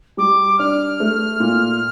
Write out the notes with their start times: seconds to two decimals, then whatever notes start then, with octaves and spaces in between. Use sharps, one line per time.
0.17 G3 D6
0.59 D4 F6
1.00 A3
1.40 A#2